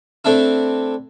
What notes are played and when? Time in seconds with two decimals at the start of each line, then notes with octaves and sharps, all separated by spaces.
0.25 A3 C4 D4 E4